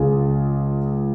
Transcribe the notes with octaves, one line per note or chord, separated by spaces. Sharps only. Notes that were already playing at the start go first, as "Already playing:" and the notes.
Already playing: C#2 C#3 G#3 F4 G#4